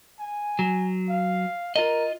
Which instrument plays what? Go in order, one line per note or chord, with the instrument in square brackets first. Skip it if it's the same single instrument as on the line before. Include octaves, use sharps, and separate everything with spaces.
[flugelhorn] G#5
[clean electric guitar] F#3
[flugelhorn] F5
[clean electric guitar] F4 D#5 [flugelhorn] A#4